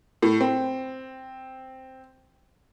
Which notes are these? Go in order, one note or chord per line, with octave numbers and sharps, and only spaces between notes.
A2
C4